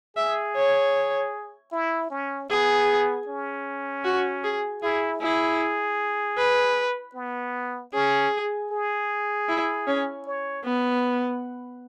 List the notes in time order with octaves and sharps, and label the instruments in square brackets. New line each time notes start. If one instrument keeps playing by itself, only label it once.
[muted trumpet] G#4 [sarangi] E5
[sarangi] C#5
[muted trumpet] E4
C#4
[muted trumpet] B3 [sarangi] G#4
[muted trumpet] C#4
[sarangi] F#4
G#4
[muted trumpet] E4 [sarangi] G#4
[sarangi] E4 [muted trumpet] G#4
[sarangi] B4
[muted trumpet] B3
[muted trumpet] C#4 [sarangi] G#4
[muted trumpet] G#4
[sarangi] E4
C#4
[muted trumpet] C#5
[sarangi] B3